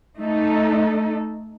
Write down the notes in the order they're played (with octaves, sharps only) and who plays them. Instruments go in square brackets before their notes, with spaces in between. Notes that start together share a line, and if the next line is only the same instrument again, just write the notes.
[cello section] A3 D#4 A4